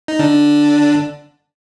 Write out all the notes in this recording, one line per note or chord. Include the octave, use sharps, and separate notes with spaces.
D#4
D3 D4